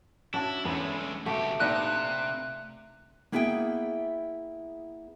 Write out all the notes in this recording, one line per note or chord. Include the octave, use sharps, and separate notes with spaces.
C#4 D4 E4 F#4 A5
E2 G#3 A3 B3 C#4
C#2 A3 F#4 G4
A#1 C3 B3 D4 D#4 E5 F#6
A#3 B3 E4 G#4 E5 G5